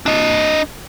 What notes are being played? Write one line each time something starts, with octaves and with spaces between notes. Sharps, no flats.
D4 D#5